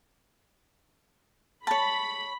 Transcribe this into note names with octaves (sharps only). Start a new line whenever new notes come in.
C#5 A5 B5